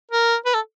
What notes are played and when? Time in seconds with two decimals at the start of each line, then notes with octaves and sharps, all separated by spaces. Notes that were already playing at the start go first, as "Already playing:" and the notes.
0.11 A#4
0.45 B4
0.54 A4